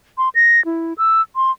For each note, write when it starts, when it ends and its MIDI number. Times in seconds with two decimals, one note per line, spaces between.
0.18 0.29 84
0.35 0.64 94
0.65 0.93 64
0.98 1.21 88
1.36 1.51 84